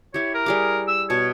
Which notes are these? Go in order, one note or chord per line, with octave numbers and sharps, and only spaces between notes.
E4 G4 C#5
A#4
G3 G#4 D6
E6
B2 C#5 A5